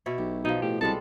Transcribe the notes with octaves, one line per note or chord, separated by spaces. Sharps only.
B2 E4 C#5
B1 G4
B2 F3 D#4
A2 G4
C2 G3 G#3 A4 A5